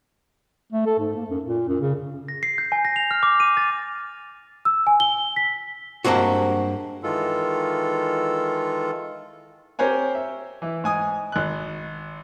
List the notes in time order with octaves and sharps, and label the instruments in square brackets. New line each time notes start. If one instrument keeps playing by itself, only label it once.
[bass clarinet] A3
A4
G#2
A#3
F#2
A#2
F#2
C#3
[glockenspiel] A#6
C7
G6
G#5
A#6
F7
F6
D6
D#7
A6
[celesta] E6
G#5
G7
B6
[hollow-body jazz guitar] G2 G#3 A#3 C4 F#4
[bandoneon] D#3 E3 G#3 F4 A4
[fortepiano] C4 G4 A#4 C5 C#5 G#5
E5
E3 E4
G#2 G#5 D#6
G#1 F#6